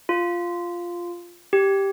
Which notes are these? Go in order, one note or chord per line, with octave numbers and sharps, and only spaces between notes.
F4
G4